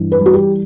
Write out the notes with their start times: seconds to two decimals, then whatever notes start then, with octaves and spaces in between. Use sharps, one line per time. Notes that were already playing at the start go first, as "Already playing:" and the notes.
Already playing: G2 E3
0.12 B4
0.19 G3
0.26 F#4
0.34 G4